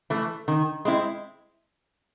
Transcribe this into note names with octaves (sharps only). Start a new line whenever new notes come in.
E3 A3
D#3
G#3 C4 E4